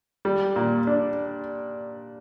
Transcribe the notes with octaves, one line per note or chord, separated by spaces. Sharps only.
G3
A#2
D4